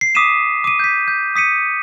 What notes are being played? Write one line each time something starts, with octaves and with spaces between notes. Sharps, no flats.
C7
D6 D#6 B6 C7 D#7 E7
D6 D#7
G6 B6
G6
D#6 B6 C#7 D#7